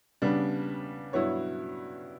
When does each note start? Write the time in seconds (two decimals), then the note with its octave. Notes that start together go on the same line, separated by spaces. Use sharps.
0.22 C#3 G3 B3 D4
1.13 G2 F#3 B3 E4 C#5